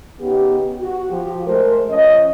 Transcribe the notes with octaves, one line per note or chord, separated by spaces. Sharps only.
C#3 B3 D#4 G4
F#4
F3 G4
G#3 A3 A4 A#4 C5
F3 C#4 D#5